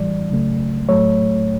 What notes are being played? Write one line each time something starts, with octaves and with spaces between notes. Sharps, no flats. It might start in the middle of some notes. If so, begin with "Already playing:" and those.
Already playing: A2 E3 G3 D5
C#2 C#3 F#3 A3
A2 F#3 A3 C#5